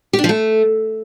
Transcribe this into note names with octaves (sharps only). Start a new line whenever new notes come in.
G4
D4
F3
A3